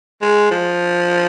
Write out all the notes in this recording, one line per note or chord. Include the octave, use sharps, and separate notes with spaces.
G#3
F3